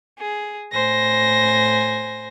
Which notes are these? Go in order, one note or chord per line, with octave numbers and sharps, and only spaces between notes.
G#4
A2 C5 G#5 A#6